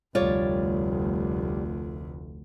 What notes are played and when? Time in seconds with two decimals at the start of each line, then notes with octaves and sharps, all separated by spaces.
0.15 F1 D2 G3 F4 C#5 D5